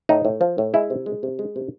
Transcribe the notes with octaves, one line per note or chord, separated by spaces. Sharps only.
A2 D#4
A2
F3
A2
G#3 E4
C3
G#3
C3
G#3
C3